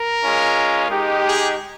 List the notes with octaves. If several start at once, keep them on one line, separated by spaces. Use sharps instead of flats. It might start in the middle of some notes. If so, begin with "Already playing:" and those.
Already playing: A#4
G#3 C#4 F4
G#3 D#4 G4
G#4